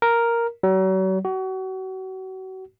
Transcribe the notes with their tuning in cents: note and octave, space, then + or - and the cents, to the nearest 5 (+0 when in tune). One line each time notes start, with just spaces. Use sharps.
A#4 +0
F#3 +40
F#4 +35